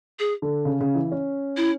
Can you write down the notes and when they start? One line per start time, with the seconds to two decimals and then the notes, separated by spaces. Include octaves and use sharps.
0.19 G#4
0.42 D3
0.65 C#3
0.81 C#3
0.95 E3
1.12 C#4
1.57 E4